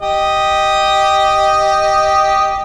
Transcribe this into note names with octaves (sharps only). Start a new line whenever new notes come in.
G4 D#5